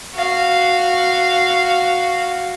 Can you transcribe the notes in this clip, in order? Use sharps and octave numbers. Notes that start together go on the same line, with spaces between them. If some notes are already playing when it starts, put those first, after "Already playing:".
F#4 F5